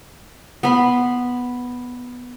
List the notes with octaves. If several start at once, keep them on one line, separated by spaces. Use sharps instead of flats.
B3 B5 C6